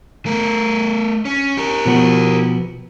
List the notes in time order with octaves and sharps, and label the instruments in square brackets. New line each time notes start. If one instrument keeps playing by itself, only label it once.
[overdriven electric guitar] A3 A#4
C#4
G4 A#4
[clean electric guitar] B2 F3 B3